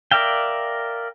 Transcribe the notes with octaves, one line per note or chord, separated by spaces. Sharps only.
A#4 D5 E5 F5 G5